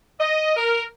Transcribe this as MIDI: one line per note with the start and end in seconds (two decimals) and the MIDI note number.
0.20 0.53 75
0.56 0.82 70